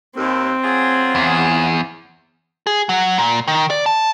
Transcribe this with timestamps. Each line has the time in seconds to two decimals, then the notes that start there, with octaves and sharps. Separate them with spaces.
0.17 D#2 C4
0.63 F#3 F4 G#4
1.15 E2
2.67 G#4
2.89 F#3
3.18 A#2
3.48 D#3
3.70 D5
3.86 A5